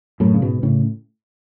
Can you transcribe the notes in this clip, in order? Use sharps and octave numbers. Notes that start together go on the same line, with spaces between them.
F#2 A2
C#3
G#2 B2
A2 C#3